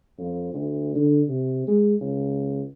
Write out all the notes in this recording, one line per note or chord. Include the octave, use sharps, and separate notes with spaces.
F2
D2
D3
C3
G#3
C#2